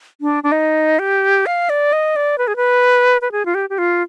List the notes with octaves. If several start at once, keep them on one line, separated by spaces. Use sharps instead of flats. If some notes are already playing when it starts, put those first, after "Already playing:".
D4
D4
D#4
G4
F5
D5
D#5
D5
B4
G#4
B4
B4
G#4
F4
G4
G4
F4